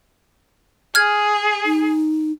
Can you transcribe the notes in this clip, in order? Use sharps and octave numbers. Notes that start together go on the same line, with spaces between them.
G#4 F6 G#6
D#4